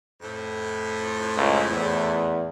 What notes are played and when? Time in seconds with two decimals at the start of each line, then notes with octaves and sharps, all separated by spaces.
0.21 F2 A2
1.37 C#2
1.70 E2